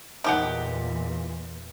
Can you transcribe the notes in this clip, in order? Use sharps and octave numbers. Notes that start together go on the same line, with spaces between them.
E2 A#2 D#3 E3 G4 F#5